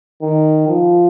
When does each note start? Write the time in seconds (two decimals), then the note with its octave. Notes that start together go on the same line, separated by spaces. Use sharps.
0.22 D#3
0.68 F3